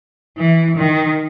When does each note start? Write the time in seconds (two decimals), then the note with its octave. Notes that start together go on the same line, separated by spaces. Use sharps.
0.37 E3
0.77 D#3